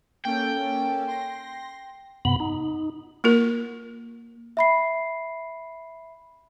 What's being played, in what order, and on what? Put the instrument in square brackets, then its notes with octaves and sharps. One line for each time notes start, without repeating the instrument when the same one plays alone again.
[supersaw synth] A#3 C#4 A4 [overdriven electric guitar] G5
[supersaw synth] C6 A#6
[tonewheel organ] G2 C3 B3 B5
D#4
[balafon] A#3 F4 A#4
[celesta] E5 B5 C7